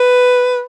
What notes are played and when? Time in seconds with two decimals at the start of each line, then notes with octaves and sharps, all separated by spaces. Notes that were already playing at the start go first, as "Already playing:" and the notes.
Already playing: B4